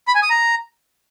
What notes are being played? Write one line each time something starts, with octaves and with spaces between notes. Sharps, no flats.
B5
G#5
D#6
A#5